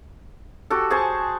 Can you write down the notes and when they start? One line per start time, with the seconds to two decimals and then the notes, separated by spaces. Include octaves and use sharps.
0.70 F#4 G4 A4
0.90 G#4 C5 A5 C#6